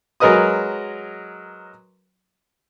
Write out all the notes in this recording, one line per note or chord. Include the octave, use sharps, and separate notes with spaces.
F#3 G#3 A#4 B4 D#5 D#6